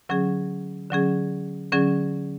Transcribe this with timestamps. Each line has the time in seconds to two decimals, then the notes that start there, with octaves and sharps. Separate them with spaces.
0.09 D3 F#3 C#4 G#4
0.91 D3 F#3 C#4 G#4
1.72 D3 F#3 C#4 G#4